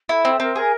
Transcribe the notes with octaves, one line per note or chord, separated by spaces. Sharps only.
E4 A4
C4 A4
C4 A#4
G#4 A#4